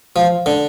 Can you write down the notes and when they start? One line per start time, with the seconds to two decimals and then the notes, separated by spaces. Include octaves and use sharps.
0.16 F3
0.46 D3